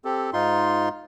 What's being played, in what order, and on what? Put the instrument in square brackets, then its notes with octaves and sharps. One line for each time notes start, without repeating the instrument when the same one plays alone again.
[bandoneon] C4 G4 A4
G#2 D#4 F4 C6